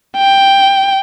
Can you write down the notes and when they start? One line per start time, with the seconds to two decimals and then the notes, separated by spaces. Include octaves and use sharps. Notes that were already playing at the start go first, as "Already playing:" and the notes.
0.17 G5